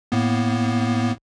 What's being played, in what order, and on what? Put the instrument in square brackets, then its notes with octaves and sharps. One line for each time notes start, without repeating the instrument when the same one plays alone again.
[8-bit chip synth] A2 A#3 B3